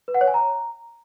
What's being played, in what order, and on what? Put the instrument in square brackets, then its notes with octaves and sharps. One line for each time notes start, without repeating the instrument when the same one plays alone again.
[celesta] B4
F#5
C#5
G#5
A#5